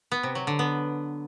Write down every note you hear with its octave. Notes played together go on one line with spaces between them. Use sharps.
B3
C3
F#3
D3
B3